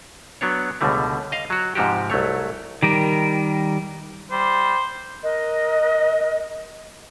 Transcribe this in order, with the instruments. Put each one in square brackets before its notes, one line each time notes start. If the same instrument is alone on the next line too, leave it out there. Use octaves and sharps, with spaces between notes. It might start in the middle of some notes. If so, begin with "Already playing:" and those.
[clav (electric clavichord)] F#3 B3 D4 C#5
C#2 B2 D3 G3 A3
D#5 F5
F#3 F#4
G#2 C3 F3 F#4 G4
C2 F#3 A3 C#5
[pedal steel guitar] D#3 G3 A#4
[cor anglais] G3 [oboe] C5
[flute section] A#4 D#5 F#6